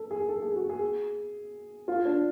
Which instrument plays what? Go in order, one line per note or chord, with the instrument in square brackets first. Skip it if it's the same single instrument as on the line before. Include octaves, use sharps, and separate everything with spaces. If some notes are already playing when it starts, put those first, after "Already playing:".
Already playing: [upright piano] A4
G#4
A4
G#4
F#4
G#4
F4
D4